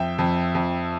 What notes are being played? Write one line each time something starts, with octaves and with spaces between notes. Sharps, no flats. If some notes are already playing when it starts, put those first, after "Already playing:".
Already playing: F2 E5 G5
F2
F2